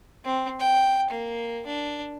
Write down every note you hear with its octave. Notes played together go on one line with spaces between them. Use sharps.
C4
G5
A#3
D4